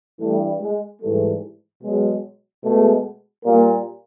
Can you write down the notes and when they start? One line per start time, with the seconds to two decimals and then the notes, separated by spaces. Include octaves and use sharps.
0.20 G2 E3 G3 A3
0.60 G#3
1.01 G#2 E3 G3 A3
1.82 B2 F#3 G#3
2.63 B2 G#3 A3
3.44 A#2 G3 A#3